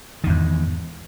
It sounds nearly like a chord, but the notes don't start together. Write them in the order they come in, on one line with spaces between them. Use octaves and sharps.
D#3 E2 G#2